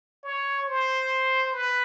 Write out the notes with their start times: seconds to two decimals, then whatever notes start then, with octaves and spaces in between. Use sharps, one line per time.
0.23 C#5
0.67 C5
1.53 B4